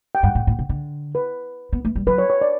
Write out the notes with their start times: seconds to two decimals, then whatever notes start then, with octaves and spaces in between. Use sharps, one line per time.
0.15 G5
0.23 G2 F#5
0.35 A2
0.47 A2
0.59 B2
0.69 D3
1.15 B4
1.73 B3
1.85 A3
1.96 G3
2.07 F#3 B4
2.18 C#5
2.30 C#5
2.41 D5